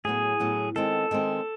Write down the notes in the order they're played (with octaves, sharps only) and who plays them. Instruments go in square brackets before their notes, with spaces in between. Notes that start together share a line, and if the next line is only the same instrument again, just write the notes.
[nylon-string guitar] A2 F#3 B3 [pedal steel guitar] G#4
[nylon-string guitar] A2 F#3 B3
[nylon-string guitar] D#3 G#3 C4 [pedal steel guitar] A4
[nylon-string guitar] D#3 G#3 C4